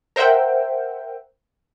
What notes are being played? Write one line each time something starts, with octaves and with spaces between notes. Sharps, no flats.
A#4 C5 E5 F#5 G5